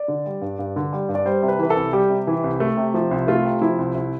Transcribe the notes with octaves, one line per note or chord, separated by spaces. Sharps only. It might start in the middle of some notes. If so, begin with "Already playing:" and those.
Already playing: D5
D3
G3
G2
G2
D3
G3
G2
D5
G3 C5
C3
B4
E3 B4
A4
C2
G3 G4
C3
E3
C2
A3
C3
F3
C2
A3 F4
C3
F3 E4
C2
C2